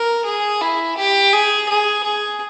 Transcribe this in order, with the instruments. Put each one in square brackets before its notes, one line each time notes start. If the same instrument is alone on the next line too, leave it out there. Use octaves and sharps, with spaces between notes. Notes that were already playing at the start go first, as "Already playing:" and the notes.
Already playing: [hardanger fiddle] A#4
G#4
E4
G4
G#4
G#4
G#4